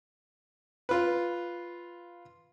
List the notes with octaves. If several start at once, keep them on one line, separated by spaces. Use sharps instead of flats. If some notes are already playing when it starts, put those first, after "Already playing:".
F4 B4